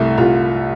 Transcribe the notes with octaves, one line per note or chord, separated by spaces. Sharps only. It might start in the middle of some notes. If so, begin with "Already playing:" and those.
Already playing: C2 A3 E4
C2 F4